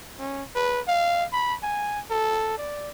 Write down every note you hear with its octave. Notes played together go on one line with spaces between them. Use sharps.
C#4
B4
F5
B5
G#5
A4
D5